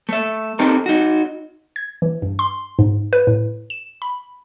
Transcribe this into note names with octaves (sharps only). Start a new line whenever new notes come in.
A3 E5
C4 D#4 G4 A4 A#4
D#4 F#4
G#6
E3
G2
C6
G#2
B4
A2
E7
B5